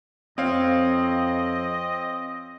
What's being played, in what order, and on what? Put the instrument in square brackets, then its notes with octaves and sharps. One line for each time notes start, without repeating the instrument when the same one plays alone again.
[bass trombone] F2 [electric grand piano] C4 C#5 F5 [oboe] D#5